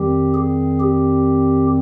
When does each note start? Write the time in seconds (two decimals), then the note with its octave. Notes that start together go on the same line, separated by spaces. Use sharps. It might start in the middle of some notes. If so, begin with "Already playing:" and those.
Already playing: F2 D#3 G3 C4 G4
0.34 G#4
0.80 G4